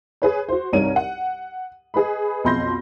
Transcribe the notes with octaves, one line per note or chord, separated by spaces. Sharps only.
G#4 B4 C#5
F#4 C5
C2 G2 D#4 A#4 C#5 D#7
F#5
G#4 B4 D#5 B5
B1 F2 B5 C6 G6 A#6